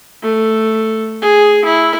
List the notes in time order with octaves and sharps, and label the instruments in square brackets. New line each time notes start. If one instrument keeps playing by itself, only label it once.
[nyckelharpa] A3
G#4
E4